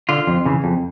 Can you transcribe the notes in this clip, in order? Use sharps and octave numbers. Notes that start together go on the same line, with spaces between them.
D3 F4
F2
C#3 E3
F2